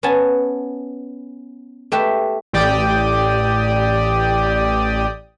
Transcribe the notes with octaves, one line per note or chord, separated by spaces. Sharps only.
B3 C#4 G#5 A5
A3 G4 B4 E5
A1 G4 D5 G5 D#6